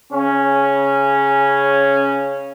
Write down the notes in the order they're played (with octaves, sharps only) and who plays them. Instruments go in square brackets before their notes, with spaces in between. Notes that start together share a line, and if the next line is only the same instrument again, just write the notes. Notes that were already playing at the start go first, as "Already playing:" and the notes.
[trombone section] C#3 C#4